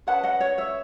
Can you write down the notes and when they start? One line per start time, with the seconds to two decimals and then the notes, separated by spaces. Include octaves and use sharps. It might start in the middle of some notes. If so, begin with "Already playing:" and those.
0.07 C#4 G#4 B4 F#5 A5
0.23 D#5 F#5
0.40 C#5
0.58 C#5 E5